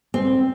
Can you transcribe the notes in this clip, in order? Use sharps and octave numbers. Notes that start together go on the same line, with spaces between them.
C4